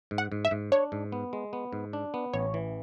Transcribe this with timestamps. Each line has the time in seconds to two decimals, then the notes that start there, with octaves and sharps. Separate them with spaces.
0.11 G#2
0.18 F#5
0.32 G#2
0.45 E5
0.51 G#2
0.72 D4 C#5
0.92 G#2
1.12 B3
1.33 G#3
1.53 B3
1.73 G#2
1.93 D4
2.14 B3
2.33 A1 C#5
2.54 E3